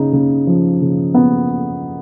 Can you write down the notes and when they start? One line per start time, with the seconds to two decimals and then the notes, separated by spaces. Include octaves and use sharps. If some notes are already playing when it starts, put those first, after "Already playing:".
Already playing: C#3 D#4
0.13 C#3
0.47 F3
0.81 C#3
1.15 B3